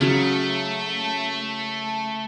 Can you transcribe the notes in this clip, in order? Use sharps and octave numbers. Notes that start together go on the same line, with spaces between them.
C#3 F#3 A3